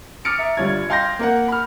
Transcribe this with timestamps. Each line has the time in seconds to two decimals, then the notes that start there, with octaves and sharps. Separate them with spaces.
0.25 D6 D#6 F6 A6 C#7 D7
0.38 E5 A#5
0.57 G1 G3 F4 C#5 G#6
0.89 D#5 F5 G5 C6 G6 A#6
1.19 A#3 A#4 F#5
1.48 B5 F6